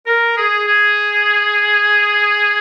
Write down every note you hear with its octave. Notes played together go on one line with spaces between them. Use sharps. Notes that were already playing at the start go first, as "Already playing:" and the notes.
A#4
G#4
G#4